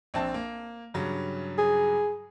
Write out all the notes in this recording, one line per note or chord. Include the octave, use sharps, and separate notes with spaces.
A#1 C4 A5
A#3
G2 C#3 F#3
G#4